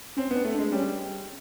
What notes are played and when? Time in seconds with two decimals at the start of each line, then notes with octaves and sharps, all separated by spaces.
0.17 C4 C#4
0.31 B3
0.36 D4
0.45 A3
0.54 D4
0.58 G#3
0.72 G3 C#4